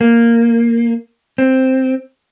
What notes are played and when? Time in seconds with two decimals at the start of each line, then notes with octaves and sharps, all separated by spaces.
0.01 A#3
1.38 C4